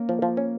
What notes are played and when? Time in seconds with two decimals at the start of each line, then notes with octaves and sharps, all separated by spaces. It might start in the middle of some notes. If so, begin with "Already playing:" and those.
Already playing: A#3 C#4
0.09 F3
0.22 F3
0.37 C#4